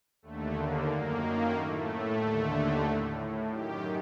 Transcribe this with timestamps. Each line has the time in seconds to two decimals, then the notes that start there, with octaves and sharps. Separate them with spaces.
0.22 D#2 D3 A3
0.55 A#3
0.87 F#2 D#3 A#3
1.52 A2 A3
2.17 D#2 D3
2.82 A2
3.48 F#2 D#3 G4